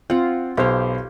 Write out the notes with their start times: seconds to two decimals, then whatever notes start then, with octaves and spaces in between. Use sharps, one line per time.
0.10 C4 F4 F#5
0.57 B1 G4 C5 F5